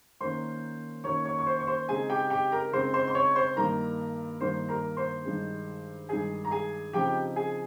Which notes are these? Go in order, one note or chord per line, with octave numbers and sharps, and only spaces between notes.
D#3 A#3 C#4 C5 C6
D#3 A#3 C#4 C#5 C#6
C#5 C#6
C#6
C5 C6
C#6
C5 C6
C#3 G#3 C4 D#4 G#4 G#5
G4 G5
G4 G5
A#4 A#5
C#3 G#3 C4 D#4 C5 C6
C5 C6
C6
C#5 C#6
C5 C6
G2 D#3 A#3 A#4 A#5
G2 D#3 A#3 C5 C6
A#4 A#5
C5 C6
G2 D#3 G#3
G2 D#3 G#3 G#4 G#5
A#5
G#4 G#5
C#3 F3 C4 D#4 G4 G5
G#4 G#5